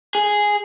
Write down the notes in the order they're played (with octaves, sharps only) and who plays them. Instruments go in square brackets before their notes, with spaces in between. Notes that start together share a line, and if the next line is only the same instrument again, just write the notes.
[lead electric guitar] G#4